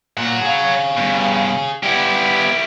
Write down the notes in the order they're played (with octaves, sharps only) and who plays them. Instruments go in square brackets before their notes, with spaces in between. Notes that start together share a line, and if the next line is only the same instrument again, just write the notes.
[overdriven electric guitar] A#2 [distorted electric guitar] C#5 F#5
[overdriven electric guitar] G#4 F5
[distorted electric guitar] G2 B2
[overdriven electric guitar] G3 B3 [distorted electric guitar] E4 G4